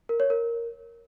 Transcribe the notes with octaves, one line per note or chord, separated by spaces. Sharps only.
A#4
C#5
A#4